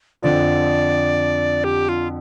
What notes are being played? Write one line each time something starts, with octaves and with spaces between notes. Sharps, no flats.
F2 D3 F3 D5
G4
F4